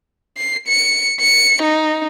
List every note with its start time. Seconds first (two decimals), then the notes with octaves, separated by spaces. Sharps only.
0.37 C7
0.68 C#7
1.21 C#7
1.62 D#4